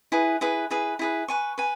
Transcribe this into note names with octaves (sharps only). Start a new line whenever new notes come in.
E4 G#4 B4
E4 G#4 B4
E4 G#4 B4
E4 G#4 B4
B4 G#5 C#6
B4 G#5